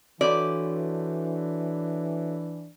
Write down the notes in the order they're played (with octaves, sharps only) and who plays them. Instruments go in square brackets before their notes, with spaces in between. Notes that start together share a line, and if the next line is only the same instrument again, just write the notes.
[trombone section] E3 D4 [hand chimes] F#4 A4 C#5 [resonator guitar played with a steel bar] D5